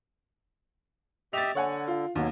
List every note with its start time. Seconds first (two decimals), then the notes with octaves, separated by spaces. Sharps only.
1.33 G4 D#5 E5 A6 F7
1.55 D3 C#5 F#5 G#5
1.88 F4
2.15 D#2 B2 F#3